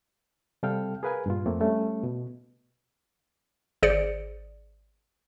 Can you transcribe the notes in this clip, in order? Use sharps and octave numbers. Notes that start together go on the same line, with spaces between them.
C3 G3 A4 F5 G5 F6
G#4 A#4 B4 F5 G#5
G2 A#2 F4
F2 A3 A#3 C4
G3 A3 C#4
B2
G#1 G#4 C5 D5 C#7 D7